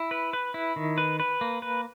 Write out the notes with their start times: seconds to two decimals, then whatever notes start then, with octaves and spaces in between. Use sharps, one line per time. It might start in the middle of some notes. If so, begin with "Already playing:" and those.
Already playing: E4
0.11 B4
0.33 B4
0.54 E4
0.76 D#3
0.98 B4
1.20 B4
1.41 A#3
1.62 B4